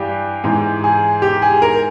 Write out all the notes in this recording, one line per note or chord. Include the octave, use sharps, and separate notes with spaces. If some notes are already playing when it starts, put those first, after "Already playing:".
Already playing: G2 E3 G4
G#2 E3
G#4
G4
G#4
A#4